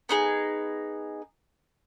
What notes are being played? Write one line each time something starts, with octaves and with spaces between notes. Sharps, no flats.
B3 D#4 G#4